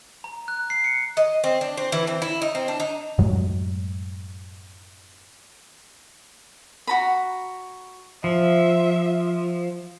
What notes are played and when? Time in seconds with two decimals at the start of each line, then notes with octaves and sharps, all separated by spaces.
0.24 A#5
0.48 F#6
0.70 C7
0.84 C#7
1.17 D#5
1.44 C4
1.61 D4
1.77 C4
1.92 E3
2.07 C4
2.22 E4
2.42 D#4
2.55 C4
2.68 D4
2.80 D#4
3.18 F#2 A2 F#3 G#3
6.87 F#4 A#5 B5
8.24 F3 E5